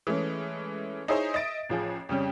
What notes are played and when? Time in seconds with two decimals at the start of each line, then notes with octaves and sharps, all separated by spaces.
0.07 E3 G#3 A3 C#4
1.08 D#4 E4 G#4 C5 C#5
1.34 D#5 E5 A6 D7
1.70 A1 F3 G#4
2.09 F2 C#3 G3 C#4